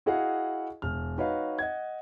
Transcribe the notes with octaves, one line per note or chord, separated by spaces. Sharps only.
E4 F#4 G#4 D#5 F5 F#5
E1 F6
D#4 F#4 B4 C#5 D#5 F5
D#5 F#5 G#6